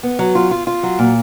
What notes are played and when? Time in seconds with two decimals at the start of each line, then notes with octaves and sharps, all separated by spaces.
0.03 B3
0.19 F#3
0.35 F4
0.51 F4
0.67 F4
0.83 F#3
0.99 A#2